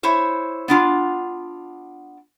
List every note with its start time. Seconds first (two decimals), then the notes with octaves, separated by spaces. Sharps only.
0.03 E4 C5 C#5
0.68 B3 D4 F4